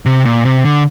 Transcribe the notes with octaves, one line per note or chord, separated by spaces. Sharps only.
C3
A#2
C3
D3